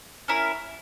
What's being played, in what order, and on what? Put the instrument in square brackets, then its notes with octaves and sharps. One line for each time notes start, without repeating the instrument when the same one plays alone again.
[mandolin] C#4 E4 A#4